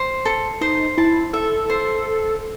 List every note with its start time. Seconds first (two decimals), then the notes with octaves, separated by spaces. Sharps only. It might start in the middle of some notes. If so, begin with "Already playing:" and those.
Already playing: C5
0.25 A4
0.61 D#4 C5
0.98 E4 A5
1.33 A4 E5
1.70 C5